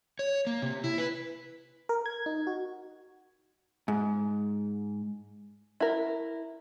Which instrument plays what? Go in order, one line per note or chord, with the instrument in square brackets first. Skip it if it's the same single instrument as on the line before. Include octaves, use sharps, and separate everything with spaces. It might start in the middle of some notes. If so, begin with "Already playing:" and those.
[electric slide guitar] C#5
A#3
C3
E4
B4
[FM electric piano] A#4
G#6
D#4
F#4
[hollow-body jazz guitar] G#2
[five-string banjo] E4 A#4